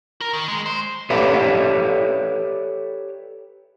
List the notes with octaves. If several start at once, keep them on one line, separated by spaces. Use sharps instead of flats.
A#4
D#3
G#3
C5
G4 A4 B4 C#5 D5 E5